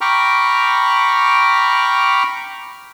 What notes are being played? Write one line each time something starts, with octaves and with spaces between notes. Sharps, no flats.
G5 A#5 B5 C#6 D6 F6